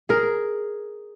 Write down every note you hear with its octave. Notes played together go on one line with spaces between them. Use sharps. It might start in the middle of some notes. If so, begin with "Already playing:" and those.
G#4 A#4